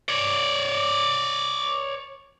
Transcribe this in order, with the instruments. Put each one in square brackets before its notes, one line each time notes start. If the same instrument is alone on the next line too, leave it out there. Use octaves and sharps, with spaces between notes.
[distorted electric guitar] C#5 D5